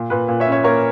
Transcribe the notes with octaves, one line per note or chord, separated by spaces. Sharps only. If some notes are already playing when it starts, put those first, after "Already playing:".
Already playing: A#2
A#2 B4
A#2
C#5 E5
C#4
C#5 E5
A#3 A#4 C#5